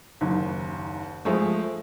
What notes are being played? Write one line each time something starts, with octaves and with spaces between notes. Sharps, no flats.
F#1 D#2
F3 G#3 A3